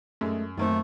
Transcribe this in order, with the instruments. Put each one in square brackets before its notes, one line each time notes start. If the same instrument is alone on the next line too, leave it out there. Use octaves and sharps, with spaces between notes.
[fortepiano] F#2 [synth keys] G#3 A3
[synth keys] F#2 [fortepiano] D#3 A#3 C4 [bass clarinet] A3